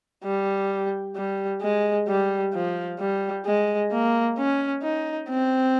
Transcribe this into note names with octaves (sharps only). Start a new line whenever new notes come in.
G3
G3
G#3
G3
F3
G3
G#3
A#3
C#4
D#4
C4